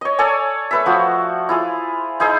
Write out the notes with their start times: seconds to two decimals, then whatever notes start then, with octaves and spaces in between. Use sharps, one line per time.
0.01 C#5 D#5
0.18 A4 C#5 D5 G#5
0.71 A3 B4 E5
0.86 F3 F#4 C5
1.49 E4 F4 G#4
2.20 D#4 E4 G#4 C5